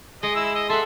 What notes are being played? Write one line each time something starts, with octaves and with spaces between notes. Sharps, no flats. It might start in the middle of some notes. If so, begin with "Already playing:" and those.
G#3 D#5
E4 E6
D#5
A4 E5 F#5 C6